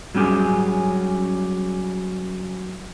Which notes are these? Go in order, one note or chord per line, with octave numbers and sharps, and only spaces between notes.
F#3 G3 C#4 G4 G#4